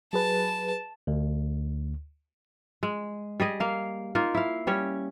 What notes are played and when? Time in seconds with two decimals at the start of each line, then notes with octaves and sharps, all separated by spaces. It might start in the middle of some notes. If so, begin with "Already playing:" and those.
0.13 F#3 G#4 B4 A5
1.07 D2
2.83 G#3
3.40 G3 G#4 D#5
3.60 A#3 F5
4.15 A#3 D#4 F4
4.34 E4 F5
4.67 G3 C#4 C#5